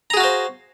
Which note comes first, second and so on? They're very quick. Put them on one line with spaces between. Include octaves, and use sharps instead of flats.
A#5 G#4 F#4 F5 C5